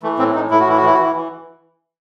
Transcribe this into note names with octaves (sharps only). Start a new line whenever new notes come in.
E3 A3
A2 C4
A2 D#4
A2 E4
F#4
E3 E4
F#4
E3 E4
F#4
E3 E4
E3